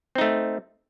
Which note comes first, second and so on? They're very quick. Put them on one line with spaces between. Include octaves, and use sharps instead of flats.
C4 D#4 A3